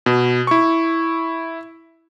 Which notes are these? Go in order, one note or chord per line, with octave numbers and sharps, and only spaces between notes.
B2
E4 C#6